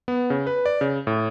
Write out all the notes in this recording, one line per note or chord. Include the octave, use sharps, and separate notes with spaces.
B3
C#3
B4
D5
C#3
A2